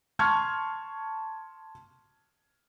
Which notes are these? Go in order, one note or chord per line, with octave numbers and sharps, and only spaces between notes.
A5 C6 C#6 F6 G#6